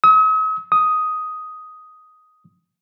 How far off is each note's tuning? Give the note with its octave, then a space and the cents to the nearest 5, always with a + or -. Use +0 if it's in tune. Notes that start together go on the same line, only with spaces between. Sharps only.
D#6 +45
D#6 +5